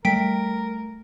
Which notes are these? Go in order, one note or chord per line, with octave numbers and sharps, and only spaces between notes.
G3 A3 A#4 G5 B6 D7